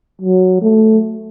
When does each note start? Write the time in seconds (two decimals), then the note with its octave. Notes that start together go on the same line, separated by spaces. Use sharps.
0.21 F#3
0.62 A3